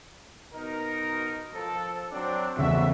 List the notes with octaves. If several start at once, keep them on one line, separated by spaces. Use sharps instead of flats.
B2 D#4 A#4
F3 A4
F#3 C4 D4
E2 C#3 F#4 E5